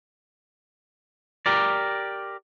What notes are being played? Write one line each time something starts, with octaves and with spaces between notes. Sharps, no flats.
G4 A#4 D5